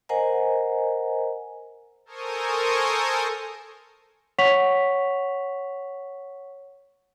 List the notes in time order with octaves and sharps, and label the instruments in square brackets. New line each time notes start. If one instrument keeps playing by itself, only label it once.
[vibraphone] A#4 C5 D#5 F#5 G#5 A#5
[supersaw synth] A4 A#4 C5 G#5 C#6 D#6
[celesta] C#5 F#5 C#6 B6 F7